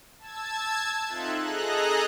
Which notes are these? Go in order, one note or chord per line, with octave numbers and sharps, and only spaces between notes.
A5 E6 G#6
C4 D#4 F4 A4 E5 F#6
G#4 A4 D#5 A#5 F#6